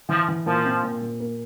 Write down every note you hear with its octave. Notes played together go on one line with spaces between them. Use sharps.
E3 F3
E3
A#2 F3
C4
A#2
A#2
A#3